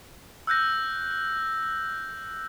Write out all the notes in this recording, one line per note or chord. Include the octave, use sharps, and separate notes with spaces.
E6 F#6 G6 A#6